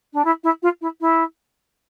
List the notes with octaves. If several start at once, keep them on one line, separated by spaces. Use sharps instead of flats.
D4
E4
E4
F4
E4
E4